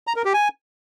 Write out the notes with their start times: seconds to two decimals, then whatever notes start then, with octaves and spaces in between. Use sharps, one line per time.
0.07 A#5
0.16 A#4
0.25 G4
0.34 G#5